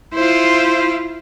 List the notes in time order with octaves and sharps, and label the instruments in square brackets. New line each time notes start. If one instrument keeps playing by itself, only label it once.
[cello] E4 F4 [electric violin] C5